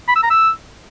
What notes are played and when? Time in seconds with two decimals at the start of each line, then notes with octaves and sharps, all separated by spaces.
0.08 B5
0.15 E6
0.23 A#5
0.30 E6